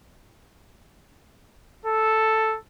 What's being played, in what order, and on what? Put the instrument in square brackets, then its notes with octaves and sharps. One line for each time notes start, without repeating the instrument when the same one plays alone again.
[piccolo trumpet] A4